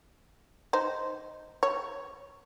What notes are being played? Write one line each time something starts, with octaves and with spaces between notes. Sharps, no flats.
D#4 C5
C#5